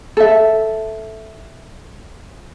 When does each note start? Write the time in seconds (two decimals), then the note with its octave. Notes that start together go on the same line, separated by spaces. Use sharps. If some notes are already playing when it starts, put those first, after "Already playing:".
0.17 A4 E5